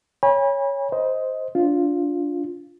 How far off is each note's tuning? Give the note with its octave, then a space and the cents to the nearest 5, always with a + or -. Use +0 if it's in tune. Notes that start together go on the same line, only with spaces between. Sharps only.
C#5 +0 G#5 -40 B5 -30
C5 +0 D#5 +15
D4 -20 F4 +0